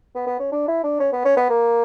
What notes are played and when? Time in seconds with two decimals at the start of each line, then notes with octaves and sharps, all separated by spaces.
0.15 B3
0.27 B3
0.39 C#4
0.52 D4
0.68 E4
0.84 D4
1.00 C#4
1.12 B3
1.25 C#4
1.37 B3
1.49 A#3